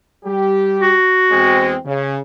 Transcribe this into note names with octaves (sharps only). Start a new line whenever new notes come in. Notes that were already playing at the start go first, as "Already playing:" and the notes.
G3 G4
F#4
E2 G#3 C4
C#3